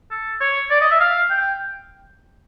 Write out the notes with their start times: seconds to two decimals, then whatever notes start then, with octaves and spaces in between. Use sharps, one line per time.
0.11 A4
0.41 C#5
0.70 D5
0.81 D#5
0.91 E5
1.00 F5
1.30 G5